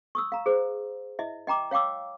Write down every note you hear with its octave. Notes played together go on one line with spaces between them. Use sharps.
C#6 D#6 E6
F5 A#5
G#4 C5
E4 D#5 E5
D#5 G5 A#5 D6
C#5 F5 G5 D6 E6